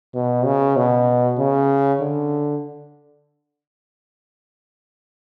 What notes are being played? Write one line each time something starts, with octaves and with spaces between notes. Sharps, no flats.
B2
C#3
B2
C#3
D3